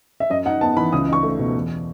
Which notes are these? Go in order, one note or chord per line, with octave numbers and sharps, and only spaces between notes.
E5
F#2 D#5
D#4 F#5
B3 A5
E3 B5
C#2 D#6
D#4 C#6
A3
B2
E2